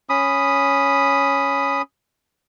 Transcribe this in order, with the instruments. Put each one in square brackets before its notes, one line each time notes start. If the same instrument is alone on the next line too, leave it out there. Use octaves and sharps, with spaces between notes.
[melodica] C#4 B5 D#6